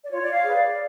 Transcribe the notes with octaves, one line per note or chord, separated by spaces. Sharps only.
D5
F4 C#5
D5
F5
G#4 B4
D5